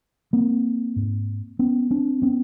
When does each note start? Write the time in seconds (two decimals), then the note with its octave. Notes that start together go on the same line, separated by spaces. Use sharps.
0.33 A#3 C4
0.96 G#2
1.59 B3 C#4
1.91 C4 D4
2.22 B3 C#4